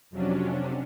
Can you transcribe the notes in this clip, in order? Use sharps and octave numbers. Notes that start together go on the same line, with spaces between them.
F2 C3 F#3 C#4 D4